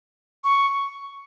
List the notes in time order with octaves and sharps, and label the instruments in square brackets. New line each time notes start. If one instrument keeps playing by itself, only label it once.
[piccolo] C#6